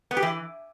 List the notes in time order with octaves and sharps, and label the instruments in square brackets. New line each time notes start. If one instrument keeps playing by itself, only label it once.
[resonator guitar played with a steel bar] B3
G4
E3